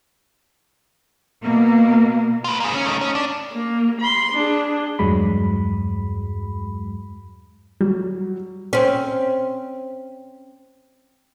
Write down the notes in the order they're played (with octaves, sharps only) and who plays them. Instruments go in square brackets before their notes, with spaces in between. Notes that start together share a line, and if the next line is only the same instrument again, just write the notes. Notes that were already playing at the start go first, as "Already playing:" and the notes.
[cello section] B2 A#3
[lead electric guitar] F4 B4
A#3 G#4
C#4
A3 D#4
C#4
D4
[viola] A#3
B5 C6
D4 G#4
[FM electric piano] E2 G2 F#3 G#3 B5
[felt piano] F#3 [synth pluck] G3
[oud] C4 C#4